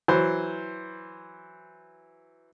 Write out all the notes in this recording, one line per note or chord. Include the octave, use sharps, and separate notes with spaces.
E3 F#3 C5